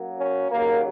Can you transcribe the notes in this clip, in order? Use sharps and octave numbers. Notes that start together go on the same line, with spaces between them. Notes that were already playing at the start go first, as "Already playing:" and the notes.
Already playing: F#2 F#3 A#3
C#4
D#2 C#3 F#3 A#3